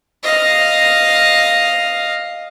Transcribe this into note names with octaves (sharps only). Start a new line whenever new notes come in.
D#5 F5